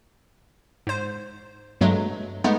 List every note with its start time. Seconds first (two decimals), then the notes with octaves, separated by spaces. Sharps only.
0.87 G#2 C5
1.81 G2 F#3 G#3 A3
2.44 G#3 A3 B3 D#4